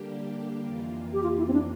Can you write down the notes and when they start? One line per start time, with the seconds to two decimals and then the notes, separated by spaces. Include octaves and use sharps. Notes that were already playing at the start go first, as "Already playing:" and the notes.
Already playing: D3 G3 A#3 D4 G4
0.63 F2 E3 A#3 F4
1.13 G4
1.23 F4
1.38 E4
1.48 C4
1.53 D4